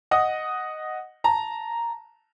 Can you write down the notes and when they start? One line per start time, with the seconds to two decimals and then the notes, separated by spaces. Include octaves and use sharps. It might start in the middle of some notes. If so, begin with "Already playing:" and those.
0.11 D#5 F#5 D#6
1.24 A5 A#5